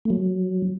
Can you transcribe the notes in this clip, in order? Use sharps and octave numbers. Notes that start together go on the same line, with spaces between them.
A3
F#3